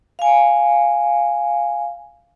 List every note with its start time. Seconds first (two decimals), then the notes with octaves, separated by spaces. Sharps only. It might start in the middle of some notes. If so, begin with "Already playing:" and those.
0.19 F5 G#5